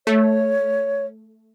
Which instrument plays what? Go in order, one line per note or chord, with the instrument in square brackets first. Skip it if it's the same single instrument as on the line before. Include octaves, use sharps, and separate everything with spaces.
[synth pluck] A3 [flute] C#5